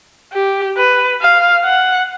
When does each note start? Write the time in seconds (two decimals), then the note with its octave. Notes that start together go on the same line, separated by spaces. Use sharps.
0.33 G4
0.77 B4
1.21 F5
1.65 F#5